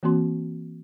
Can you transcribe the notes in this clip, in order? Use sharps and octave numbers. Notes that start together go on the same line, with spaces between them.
E3 A#3 C4 F#4 C6